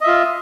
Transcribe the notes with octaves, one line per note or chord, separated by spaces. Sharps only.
F4 D#5 E5